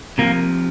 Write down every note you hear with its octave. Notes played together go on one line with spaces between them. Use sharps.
C3 F3 A#3